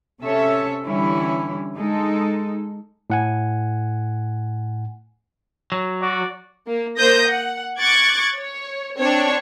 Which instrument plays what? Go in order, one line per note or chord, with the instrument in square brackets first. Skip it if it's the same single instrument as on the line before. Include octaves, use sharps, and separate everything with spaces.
[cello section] C3 C#4 A4 C#5 E5
D3 E3 G3 C#4 E4
G#3 D#4 A4
[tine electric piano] A2 F#5 G#5
[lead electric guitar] F#3
[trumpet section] F#4 D5
[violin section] A#3
A#3 C5 D#6 G6 A#6
F#5
C#6 D6 F#6 G#6 A6
C#5
C4 D4 C#5